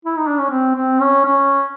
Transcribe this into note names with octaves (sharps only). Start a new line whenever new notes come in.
E4
D#4
D4
C#4
C4
C4
C#4
C#4